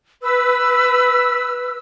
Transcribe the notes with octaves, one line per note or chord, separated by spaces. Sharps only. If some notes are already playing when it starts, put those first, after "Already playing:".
B4 E6